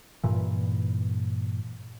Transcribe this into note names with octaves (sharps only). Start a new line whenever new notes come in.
G2 A#2 E3